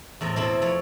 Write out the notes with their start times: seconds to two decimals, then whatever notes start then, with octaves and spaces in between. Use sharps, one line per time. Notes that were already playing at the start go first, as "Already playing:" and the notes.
0.21 E2 A2 C4 A#5
0.36 B2 A3 C4 E4
0.62 F2 C#5